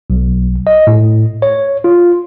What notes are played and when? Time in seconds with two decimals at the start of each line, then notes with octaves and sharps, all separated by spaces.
0.10 B1
0.67 D#5
0.87 A2
1.42 C#5
1.84 F4